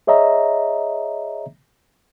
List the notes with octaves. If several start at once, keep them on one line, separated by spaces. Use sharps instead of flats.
G#4 C#5 D#5 E5 A#5